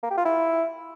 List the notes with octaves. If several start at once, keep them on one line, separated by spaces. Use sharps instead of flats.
A#3
G4
F4
E4